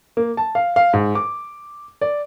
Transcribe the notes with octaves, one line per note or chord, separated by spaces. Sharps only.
A#3
A5
F5
F5
G#2
D6
D5